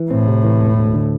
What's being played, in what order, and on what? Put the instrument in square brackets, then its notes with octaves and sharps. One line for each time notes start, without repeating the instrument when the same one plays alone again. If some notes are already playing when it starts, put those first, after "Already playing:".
Already playing: [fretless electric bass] E3
[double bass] A2 [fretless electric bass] C4
[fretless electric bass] C3
E3
E1
D2
D3